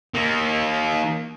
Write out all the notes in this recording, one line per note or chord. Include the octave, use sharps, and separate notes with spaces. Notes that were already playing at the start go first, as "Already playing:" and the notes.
D#3 A#3